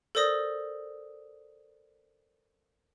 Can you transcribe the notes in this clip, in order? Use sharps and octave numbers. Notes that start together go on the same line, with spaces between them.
A4 A#4 C5 D5 D#6 A#6